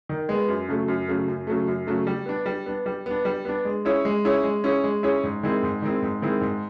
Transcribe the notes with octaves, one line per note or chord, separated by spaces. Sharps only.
D#3
G#3 B3
F#2
C#3 F#3 A3
F#2
C#3 F#3 A3
F#2
C#3 F#3 A3
F#2
C#3 F#3 A3
G3
B3 D4
G3
B3 D4
G3
B3 D4
G3
B3 D4
G#3
C#4 E4 G#4 C#5
G#3
C#4 E4 G#4 C#5
G#3
C#4 E4 G#4 C#5
G#3
C#4 E4 G#4 C#5
G#2
D#3 G#3 C4 E4
G#2
D#3 G#3 C4 E4
G#2
D#3 G#3 C4 E4
G#2